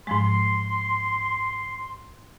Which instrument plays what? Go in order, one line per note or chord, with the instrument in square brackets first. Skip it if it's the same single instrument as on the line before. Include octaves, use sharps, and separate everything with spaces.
[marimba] G#2 F3 G#3 [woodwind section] C6